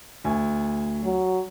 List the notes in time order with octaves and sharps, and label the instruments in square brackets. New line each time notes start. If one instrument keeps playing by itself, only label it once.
[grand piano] D2 G#5
[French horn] F#3